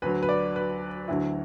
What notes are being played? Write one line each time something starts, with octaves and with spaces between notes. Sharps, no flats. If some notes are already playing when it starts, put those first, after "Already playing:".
D2 D3 F#3 B4
B4
D5
B4
D2 D3 F#3 E4